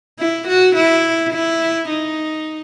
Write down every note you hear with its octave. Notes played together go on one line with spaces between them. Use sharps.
E4
F#4
E4
E4
D#4